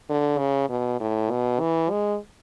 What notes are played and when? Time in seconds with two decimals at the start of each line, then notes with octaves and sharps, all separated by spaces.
0.10 D3
0.39 C#3
0.69 B2
1.00 A2
1.31 B2
1.60 E3
1.90 G#3